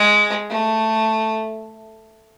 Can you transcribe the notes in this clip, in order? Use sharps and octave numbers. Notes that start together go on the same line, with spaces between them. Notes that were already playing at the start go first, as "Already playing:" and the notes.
Already playing: G#3
A3